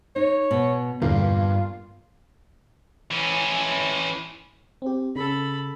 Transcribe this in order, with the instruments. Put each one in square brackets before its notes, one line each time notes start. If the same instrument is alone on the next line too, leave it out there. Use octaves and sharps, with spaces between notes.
[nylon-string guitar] D#4 [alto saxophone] C#5
[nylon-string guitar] B2
[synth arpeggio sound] E2 A#2 D3 [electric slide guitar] G2 [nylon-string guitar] A#3 [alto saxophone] F4
[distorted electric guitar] E3 C#4
[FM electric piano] C4 G4
[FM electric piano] C#3 [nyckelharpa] A4 B5